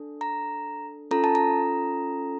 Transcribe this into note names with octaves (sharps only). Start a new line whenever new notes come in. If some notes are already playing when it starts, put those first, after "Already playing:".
Already playing: D4 A4
A#5
C#4 F4 A4 A#5
A5
A#5